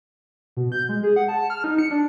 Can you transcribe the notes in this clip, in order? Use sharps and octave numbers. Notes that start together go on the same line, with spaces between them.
B2
G6
G#3
G#4
F#5
A5
F6
D#4
C#7
D4